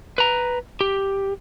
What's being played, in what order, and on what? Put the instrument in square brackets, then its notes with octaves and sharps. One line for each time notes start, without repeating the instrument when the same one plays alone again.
[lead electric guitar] B4 A#5
G4